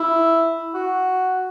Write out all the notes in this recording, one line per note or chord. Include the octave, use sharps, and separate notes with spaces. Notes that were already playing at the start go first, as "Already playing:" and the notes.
Already playing: E4
F#4